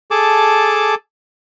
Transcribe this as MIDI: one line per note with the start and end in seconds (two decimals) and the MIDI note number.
0.11 0.95 68
0.11 0.95 69
0.11 0.95 81
0.11 0.95 86